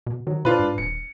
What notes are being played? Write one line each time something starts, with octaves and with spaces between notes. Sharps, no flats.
B2
D#3 F#3
B2 D4 F4 B4
G#2
D#1 C#7